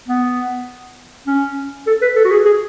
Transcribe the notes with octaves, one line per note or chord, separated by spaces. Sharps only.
B3
C#4
A4
B4
A4
F#4
G#4
G#4